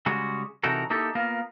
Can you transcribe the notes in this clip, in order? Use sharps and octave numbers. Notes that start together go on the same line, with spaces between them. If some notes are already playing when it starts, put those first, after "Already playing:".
C#3 G3 G#3 F#4
C3 E3 D#4 F#4 A4 A#4
A#3 D#4 E4 G4 A4
A#3 B3 F4 A#4